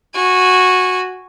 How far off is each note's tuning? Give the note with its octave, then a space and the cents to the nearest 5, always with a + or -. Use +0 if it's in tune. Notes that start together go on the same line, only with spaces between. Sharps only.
F#4 -10 G#5 -10